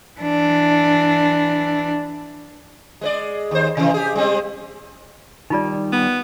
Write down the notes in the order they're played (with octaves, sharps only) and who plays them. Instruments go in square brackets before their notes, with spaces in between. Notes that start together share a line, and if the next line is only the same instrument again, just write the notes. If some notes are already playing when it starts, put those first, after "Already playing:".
[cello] E3 D4
[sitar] G#3 B4 D5
D#2 C5
C3 E3
G4 G#4
G3 G#3 C4
[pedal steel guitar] D#3 G3 [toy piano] D#4 F4 D5
[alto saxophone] B3